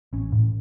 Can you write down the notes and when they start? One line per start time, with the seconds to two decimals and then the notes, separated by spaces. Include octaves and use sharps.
0.13 A1 C#4
0.32 A2